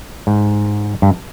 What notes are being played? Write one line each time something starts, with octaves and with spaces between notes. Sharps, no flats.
G#2
G2